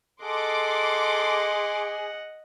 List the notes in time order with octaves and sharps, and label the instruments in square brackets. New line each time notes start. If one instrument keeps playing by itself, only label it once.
[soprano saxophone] G#4 [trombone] A4 [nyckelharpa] D#5 F#5 [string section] C6 D6